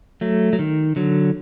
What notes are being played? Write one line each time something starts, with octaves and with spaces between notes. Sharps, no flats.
F#3 A3
F#3
D#3
D3 F#3